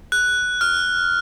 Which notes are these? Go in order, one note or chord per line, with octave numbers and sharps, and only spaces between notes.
F#6
F6